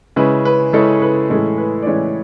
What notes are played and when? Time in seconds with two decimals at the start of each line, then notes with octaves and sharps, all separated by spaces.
0.16 C#3 G#3 C#4 E4 B4
0.45 B4
0.73 C#3 G#3 C#4 E4 A4
1.02 B4
1.30 A2 E3 G#3 C#4 E4 A4
1.58 B4
1.82 D5
1.86 A2 E3 G#3 C#4 E4 C#5